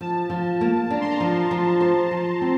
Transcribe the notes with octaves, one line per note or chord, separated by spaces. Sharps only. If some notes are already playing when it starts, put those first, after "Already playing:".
F3 A5
F3
A#3
D4 A#5
C6
A#5
F3
F3
C5
F3
C4